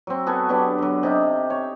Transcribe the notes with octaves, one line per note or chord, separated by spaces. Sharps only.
F#3 C4
B3 F#4 A4 G#5
F#3 B3 D4 G4
D3 F#3
C3 D#4 G4
C#5